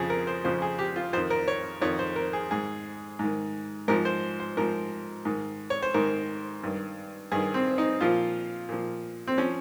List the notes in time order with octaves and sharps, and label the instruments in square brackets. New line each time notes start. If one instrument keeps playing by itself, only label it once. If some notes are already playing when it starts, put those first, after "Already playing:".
Already playing: [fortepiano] F2 C#3 F3 G#4
A#4
C5
F2 C#3 F3 C5
G#4
G4
F4
F2 C5
D#3
A#4
C#5
F2 D#3 C#5
C5
A#4
G#4
G#2 D#3 G#4
G#2 D#3
G#2 F3 A#4
C5
C5
G#2 F3 A#4
G#2 D#3
C#5
C5
G#2 D#3 A#4
G2 D#3
G2 D#3 G#4
C4
D#4
A#2 F3 F4
A#2 F3
C4
F3 C#4